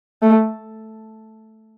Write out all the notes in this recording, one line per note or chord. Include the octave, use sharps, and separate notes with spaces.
A3